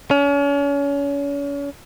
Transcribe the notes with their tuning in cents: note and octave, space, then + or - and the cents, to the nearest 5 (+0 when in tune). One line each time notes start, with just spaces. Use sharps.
C#4 +35